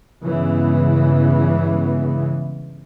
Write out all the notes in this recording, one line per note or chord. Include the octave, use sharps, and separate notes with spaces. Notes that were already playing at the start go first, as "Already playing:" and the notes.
G2 C#3 E3 G#3 B3